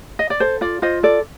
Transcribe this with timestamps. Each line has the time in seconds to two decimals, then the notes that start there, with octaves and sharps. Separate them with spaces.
0.19 D#5
0.30 D5
0.40 A4 C5
0.61 F4 D5
0.82 F4 C5 D#5
1.03 A4 D5